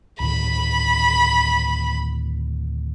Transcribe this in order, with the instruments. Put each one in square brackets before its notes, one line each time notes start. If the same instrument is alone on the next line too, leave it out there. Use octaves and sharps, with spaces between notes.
[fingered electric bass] D2 A2 D#3 [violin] B5